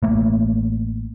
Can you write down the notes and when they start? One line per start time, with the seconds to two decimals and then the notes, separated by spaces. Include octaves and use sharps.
0.03 A1 A3 A#3